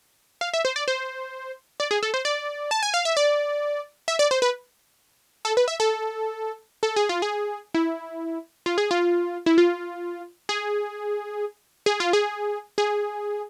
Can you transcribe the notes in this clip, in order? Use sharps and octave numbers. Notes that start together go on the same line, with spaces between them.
F5
E5
C5
D5
C5
D5
G#4
A4
C5
D5
A5
G#5
F5
E5
D5
E5
D5
C5
B4
A4
B4
E5
A4
A4
G#4
F4
G#4
E4
F4
G#4
F4
E4
F4
G#4
G#4
F4
G#4
G#4